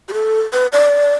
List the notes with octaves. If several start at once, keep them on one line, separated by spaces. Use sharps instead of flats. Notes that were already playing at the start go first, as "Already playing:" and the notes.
G4
A4
B4
D5